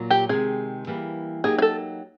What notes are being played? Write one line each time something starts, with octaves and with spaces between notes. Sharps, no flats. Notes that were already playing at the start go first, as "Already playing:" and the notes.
Already playing: A#2 F#3 A#3
G4
C3 D#3 G#3 G#4
E3 G3 A#3
F#3 A#3 D#4 G4 G#4
G#4
A4